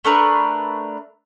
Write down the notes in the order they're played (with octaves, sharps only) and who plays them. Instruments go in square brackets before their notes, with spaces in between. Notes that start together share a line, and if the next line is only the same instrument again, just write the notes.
[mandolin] A3 D4 A#4 B4